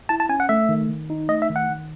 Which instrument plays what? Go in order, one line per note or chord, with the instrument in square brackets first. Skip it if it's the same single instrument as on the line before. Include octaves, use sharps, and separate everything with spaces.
[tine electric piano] E4 A5
A5
C#4 G#5
F#5
A3 E5
D#3
D#3
D#4
A3 D#5
E5
D#3
F#5
D#3